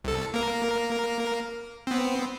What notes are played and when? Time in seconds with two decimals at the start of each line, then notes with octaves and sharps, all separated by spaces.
0.04 C2 A4
0.34 A#3 A#4
1.87 B3 C4